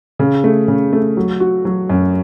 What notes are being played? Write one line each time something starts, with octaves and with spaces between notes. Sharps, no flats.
C#3
A3
C#3
A3
F#3
F#4
F#3
F#2